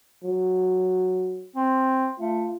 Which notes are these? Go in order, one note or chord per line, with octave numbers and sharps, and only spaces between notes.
F#3
C4
A3 F4